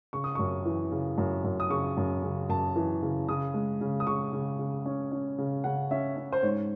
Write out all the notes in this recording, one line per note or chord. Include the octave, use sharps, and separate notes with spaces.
C#3 C#6
D#6
F#2 C#6
E3
C#3
F#2
F#2
D#6
C#3 C#6
F#2
C#3
F#2 A5
E3
C#3
C#3 D#6
G#3
C#3
D#6
C#3 C#6
C#3
C#3
C#4
C#4
C#3
C#3 F#5
C#4 E5
C#4
C5
G#2 C#5